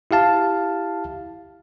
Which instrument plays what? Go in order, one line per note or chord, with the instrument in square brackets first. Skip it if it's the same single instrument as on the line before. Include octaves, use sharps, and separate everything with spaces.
[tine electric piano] E4 G4 F5 A5